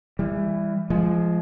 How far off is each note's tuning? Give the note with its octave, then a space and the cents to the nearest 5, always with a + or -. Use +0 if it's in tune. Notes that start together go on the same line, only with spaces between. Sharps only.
E3 +10 G3 +40
F3 -20 G#3 +5